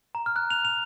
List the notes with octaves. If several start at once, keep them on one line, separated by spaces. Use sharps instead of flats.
A#5
F6
F#6
F7
F7